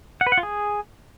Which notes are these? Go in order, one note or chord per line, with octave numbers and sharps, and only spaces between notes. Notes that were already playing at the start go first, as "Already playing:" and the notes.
F#5
B4
F#5
F4
G#4